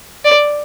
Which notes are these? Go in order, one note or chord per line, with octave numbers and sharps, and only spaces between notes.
D5